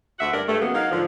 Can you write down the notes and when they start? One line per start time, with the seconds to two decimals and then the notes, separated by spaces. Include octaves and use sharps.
0.19 D2 E5 F#5
0.33 G2 A#4 D5
0.48 G2 A3
0.60 C#3 F#3 G#3 A#3 B3
0.75 F#3 A#3 D#4 F5
0.91 G#2 D3 F3